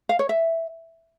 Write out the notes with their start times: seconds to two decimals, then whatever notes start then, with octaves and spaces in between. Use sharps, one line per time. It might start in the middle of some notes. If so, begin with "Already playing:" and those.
0.09 F5
0.19 C#5
0.29 E5